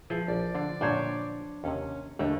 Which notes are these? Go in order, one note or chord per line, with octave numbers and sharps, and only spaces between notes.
F3 E4 G#4 B4
A#1 D5
D3 D4 F4
F#2 A#2 D3 D4 C5 C#5
D#2 C3 C#4
D#2 D3 G3 A3 D4